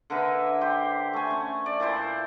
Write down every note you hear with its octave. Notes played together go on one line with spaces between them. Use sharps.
D3 A#3 B4 E5
G4 C5
A3 G#5
C#4
D5
A#2 E4 C5 A5